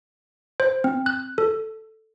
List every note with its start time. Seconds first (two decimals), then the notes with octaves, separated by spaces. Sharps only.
0.60 C5
0.84 C4
1.06 F#6
1.38 A4